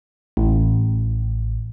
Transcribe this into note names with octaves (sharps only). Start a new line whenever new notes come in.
A1